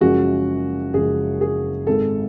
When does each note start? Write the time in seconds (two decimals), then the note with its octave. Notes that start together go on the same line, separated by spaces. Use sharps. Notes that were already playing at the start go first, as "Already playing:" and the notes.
0.01 F#1 F#2 C#3 F3 G#3 F#4
0.94 F#1 F#2 C#3 F3 G#3 G#4
1.41 G#4
1.87 G#1 G#2 G#3 A4